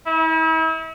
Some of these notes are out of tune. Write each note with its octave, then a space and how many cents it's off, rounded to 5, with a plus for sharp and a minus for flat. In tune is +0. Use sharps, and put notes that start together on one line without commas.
E4 -40